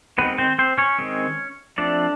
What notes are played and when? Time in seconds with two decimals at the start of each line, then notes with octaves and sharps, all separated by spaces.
0.18 D#3 G#3 B3 C4 B4
0.38 C4 C5
0.59 C4 C5
0.78 C#4 C#5
0.98 D#3 G#3 C4
1.78 F3 A3 C4 D4 D5